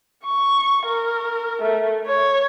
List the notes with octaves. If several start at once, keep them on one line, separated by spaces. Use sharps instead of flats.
C#6
A#4
A3
C#5